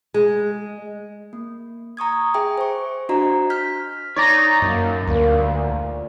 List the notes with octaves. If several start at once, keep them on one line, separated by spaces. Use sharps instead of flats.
G#3
A#3
A#5 C#6 D#6 G#6
G#4 E5 G5 G#5
C5 C#6
D4 F#4 C5 D#5 A#5
F6 G6 B6
D#4 C#5 D5 A#5
F#2 A#3
D2 G2 D#3 A#3
A#2